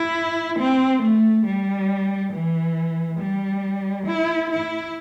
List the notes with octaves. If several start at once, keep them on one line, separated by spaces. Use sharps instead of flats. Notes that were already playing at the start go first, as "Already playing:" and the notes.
Already playing: E4
C4
A3
G3
E3
G3
E4
E4